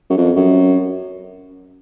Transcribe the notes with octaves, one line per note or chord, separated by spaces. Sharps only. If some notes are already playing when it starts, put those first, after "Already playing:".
F#2
F2
F#2